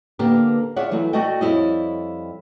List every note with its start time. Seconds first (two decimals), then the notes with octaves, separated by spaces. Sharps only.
0.19 D3 A#3 B3 D4 G4 A#4
0.76 F4 G#4 C#5 D5 E5 F#5
0.91 E3 F#3 A3 E4
1.13 A3 F#4 D5 D#5 G5
1.41 F2 G3 E4 C#5 D#5